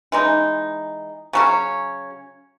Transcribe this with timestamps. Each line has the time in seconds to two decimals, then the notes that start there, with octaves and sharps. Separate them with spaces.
0.12 E3 G#3 D#4
1.33 C#3 F#3 C#4